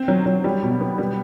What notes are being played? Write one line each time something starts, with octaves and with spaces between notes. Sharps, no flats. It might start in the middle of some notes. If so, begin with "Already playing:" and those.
Already playing: C4
F#3
F#3
G3
B2
B3
G3